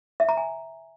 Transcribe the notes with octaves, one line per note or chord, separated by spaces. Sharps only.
E5
A#5
G#5